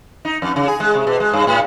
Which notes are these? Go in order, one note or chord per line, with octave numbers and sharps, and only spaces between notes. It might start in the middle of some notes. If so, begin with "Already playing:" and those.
D#4
F2
C#3
G#4
G#3
C3
B2
G#3
G2
A2